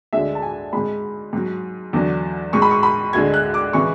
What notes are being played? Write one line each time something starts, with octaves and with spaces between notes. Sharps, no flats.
D2 D3 G#3 E5
A5
G#5
G#2 G#3 B5
G#2 F#3
E2 D3 F#3
G#2 G#3 C#6
B5
C#6
B5
D2 D3 G#3 G#6
F#6
D6
C#3 E3 G#3 C#6